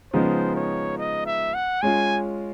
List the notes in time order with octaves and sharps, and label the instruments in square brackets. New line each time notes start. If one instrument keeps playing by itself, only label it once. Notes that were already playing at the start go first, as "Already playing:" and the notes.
[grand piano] C#3 F3 G#3 B3 D#4 [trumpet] C5
[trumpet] C#5
D#5
E5
F#5
[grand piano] G#3 C#4 F4 [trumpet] G#5